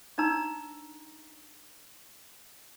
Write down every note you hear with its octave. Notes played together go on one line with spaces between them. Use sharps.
D4 D#4 A#5 E6